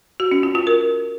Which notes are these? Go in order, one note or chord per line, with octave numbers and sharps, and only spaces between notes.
F#4
C#4
F4
F4
A#4